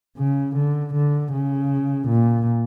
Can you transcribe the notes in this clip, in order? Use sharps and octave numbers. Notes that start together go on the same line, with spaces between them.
C#3
D3
D3
C#3
A#2